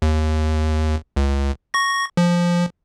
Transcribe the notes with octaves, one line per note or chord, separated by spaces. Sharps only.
D#2
C#2
C#6 A#6
F3